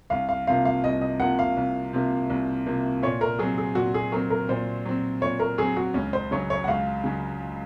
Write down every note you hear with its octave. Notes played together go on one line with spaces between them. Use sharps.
C2 F5
F5
C3 F3 A#3 F5
F5
C2 D#5
D#5
C3 F3 A#3 F#5
F5
C2
C3 F3 A#3
C2
C3 F3 A#3
A#2 C#5
A#4
F#3 C4 G#4
G#4
A#2 F#4
G#4
F#3 C4 A#4
A#4
A#2 C5
F#3 C4
A#2 C#5
A#4
F#3 C4 G#4
F#4
C#2 C#4
C5
C#3 F#3 C#5
C#5
F#5
C#2 F5
C#3 F#3